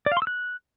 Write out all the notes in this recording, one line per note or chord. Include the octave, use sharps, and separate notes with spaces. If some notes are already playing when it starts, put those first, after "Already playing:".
D5
F5
C6
E6
F#6